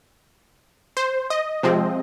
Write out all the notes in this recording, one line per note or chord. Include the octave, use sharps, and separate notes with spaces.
C5
D#5
C3 F3 G#3 C4